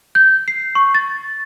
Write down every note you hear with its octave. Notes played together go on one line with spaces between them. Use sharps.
G6
C7
C#6
A6